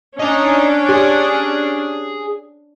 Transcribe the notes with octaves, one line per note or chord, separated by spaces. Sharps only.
C#4 D4 D#5 A#5
G4 G#4 G#5